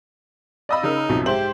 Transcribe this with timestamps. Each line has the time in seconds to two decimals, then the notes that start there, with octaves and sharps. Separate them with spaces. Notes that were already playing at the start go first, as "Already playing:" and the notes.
0.69 D5 D#5 F5 B5 E6
0.83 C#3 D#4 A#4
1.09 B1 F#2 C3 F3
1.26 G#2 G4 C5 E5 F#7